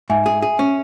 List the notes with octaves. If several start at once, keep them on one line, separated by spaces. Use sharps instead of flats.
G#2 E5 G#5
G#4
G#4
C#4